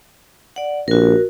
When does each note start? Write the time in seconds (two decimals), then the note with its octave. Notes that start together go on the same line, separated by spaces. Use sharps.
0.56 D5 F#5
0.88 A#1 F#4 A#4